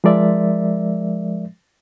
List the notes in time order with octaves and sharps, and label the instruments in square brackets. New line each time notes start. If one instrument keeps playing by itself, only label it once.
[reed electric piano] F3 G#3 A#4 D5 E5